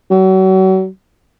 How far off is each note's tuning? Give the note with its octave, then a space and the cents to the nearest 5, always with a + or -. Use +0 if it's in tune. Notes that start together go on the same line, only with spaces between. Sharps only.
F#3 +35